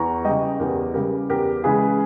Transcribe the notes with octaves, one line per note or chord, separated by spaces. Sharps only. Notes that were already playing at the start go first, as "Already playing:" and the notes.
Already playing: E2 A#5 C#6
C#3 G3 D#5 G5
E2 G4 A#4
C#3 G3 G4 A#4
E2 G4 A#4
C#3 E3 G#3 G#4 B4